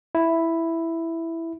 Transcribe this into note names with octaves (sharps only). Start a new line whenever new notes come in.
E4